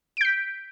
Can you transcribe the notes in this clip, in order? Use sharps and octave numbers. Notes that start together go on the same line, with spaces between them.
G6 B6 D7